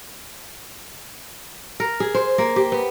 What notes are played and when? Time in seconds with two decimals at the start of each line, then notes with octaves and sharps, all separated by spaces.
1.80 A#4
2.00 G#4
2.15 C5
2.38 A#3
2.56 G4
2.72 B3